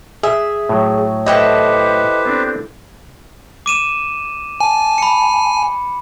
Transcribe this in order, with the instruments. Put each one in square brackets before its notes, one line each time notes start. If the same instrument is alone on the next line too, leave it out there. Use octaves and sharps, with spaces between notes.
[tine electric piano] G#4 [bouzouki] E5
[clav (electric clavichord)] A2 F#3
[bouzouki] E4 A4 G5 [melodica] G4 B4 C5 [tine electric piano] D#5
[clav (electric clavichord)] B3 C4 D4
[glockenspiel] D6 D#7 E7
[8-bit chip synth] G#5 [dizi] A5
[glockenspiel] B5 C#7